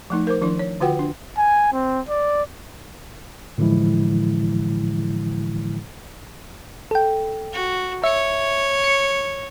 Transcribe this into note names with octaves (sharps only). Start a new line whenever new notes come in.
F3 A3 D#4
A#4 C5 D6
D#3 F3 D4 E4
C#5
D3 F4 F#4 B4 F#5 G5
D4
G#5
C4
D5
A2 D3 E3 F3 G#3 E4
A4 G5
F#4
C#5 E5 C#7
C#7